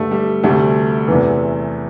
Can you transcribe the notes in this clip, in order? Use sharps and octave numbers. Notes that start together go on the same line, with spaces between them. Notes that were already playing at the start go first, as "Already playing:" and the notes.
Already playing: G2 D3 G3 A3
G3
D2 C3 G3 A3
E2 C3 E3